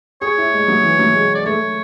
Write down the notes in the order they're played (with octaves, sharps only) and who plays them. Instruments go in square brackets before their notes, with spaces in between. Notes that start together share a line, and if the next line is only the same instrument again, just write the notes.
[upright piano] G#4 [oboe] C#5
[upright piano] E4
G#3
F#3
E3
F#3
G#3
[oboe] D5
[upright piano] A3 [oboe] C#5